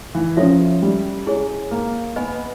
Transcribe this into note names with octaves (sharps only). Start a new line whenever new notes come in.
E3
F3 C#4 E4 A4 C#5 E5
G3
G#3 E4 G#4 C#5
A#3
B3 B4 D#5 G#5 B5